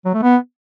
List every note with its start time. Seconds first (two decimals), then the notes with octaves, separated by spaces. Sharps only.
0.06 F#3
0.14 A3
0.23 B3